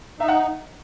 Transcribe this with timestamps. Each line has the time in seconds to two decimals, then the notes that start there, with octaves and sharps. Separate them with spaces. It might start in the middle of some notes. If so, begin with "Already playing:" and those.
0.19 D#4 E5
0.28 F#5